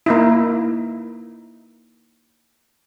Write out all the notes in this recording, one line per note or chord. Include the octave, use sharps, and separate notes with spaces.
A#3 D#4 E4